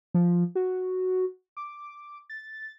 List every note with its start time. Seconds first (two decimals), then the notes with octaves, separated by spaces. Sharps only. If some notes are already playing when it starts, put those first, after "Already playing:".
0.14 F3
0.55 F#4
1.57 D6
2.30 A6